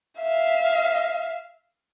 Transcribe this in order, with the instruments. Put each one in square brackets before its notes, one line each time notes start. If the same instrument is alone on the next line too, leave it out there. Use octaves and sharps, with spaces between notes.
[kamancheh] E5 F5